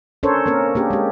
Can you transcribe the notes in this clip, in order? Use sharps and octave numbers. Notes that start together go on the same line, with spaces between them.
C#4 D4 A4 A#4 C5 C#5
A#3 C4 C#4 A#4 C5
A#3 D4 G4 G#4
G#3 G4